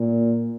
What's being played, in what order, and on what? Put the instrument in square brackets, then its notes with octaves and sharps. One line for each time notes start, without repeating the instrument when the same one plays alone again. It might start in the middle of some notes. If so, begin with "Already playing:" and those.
Already playing: [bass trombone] A#2